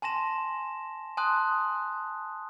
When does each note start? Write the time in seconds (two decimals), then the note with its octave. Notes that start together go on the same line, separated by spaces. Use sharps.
0.02 G#5 A5 C6 A#6 E7
1.17 G#5 A5 C6 D#6 F#6